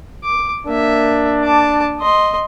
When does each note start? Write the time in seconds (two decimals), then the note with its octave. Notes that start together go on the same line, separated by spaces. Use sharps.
0.24 D6
0.66 A#3 D4 E5
1.44 A5 D6
2.00 D#5 C6